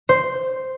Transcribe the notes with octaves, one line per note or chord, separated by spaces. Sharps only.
C5